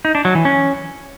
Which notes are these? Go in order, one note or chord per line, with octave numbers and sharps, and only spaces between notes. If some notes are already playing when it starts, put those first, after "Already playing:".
D#4
D4
F#3
E3
C#4